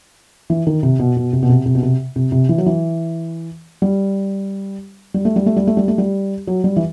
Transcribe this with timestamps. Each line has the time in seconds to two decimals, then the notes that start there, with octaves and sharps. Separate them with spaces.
0.50 E3
0.67 D#3
0.83 C3
0.99 B2
1.17 B2
1.33 C3
1.43 B2
1.49 C3
1.66 C3
1.75 B2
1.83 C3
2.16 C3
2.32 C3
2.49 E3
2.58 F#3
2.66 E3
3.82 G3
5.14 G3
5.25 A3
5.36 G3
5.46 A3
5.56 G3
5.67 A3
5.77 G3
5.88 A3
5.98 G3
6.47 F#3
6.64 G3
6.76 E3